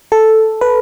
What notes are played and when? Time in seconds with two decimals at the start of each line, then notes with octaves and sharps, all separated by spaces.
0.12 A4
0.61 B4